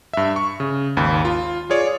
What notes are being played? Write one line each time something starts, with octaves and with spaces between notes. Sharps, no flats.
G2 E5
C#6
C#3
G#1 D#2 B5
F4
F4 G#4 C#5 D5